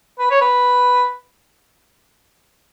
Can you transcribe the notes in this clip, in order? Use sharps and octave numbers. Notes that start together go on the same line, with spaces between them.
B4
C#5
B4